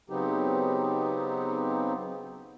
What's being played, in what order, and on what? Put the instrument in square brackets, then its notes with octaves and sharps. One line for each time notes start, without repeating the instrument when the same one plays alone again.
[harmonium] C#3 F#3 B3 C4 D#4 G4